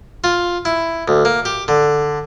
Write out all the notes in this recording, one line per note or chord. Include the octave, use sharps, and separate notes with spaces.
F4
E4
D2
A#3
G4
D3